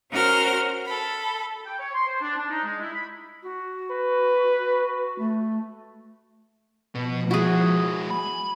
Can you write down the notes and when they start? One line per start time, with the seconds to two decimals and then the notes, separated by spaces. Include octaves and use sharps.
0.11 C#4 F#4 A#4 C5 F6
0.86 A4 B5
1.66 G5
1.80 C#5
1.94 C6
2.07 C5
2.21 D4
2.37 D4
2.50 D#4
2.64 G#3
2.80 E4
2.94 B5
3.43 F#4
3.91 B4
4.58 F#4
5.18 A3
6.95 B2 F3 B4 F#5
7.31 G#3 E4 F#4 G#4
7.72 G#5
8.10 B5